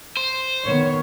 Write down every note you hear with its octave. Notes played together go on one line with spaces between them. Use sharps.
C5
D#3 B3 C#5